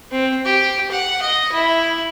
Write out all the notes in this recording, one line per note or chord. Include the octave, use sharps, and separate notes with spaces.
C4
G4
F#5
D#5
E4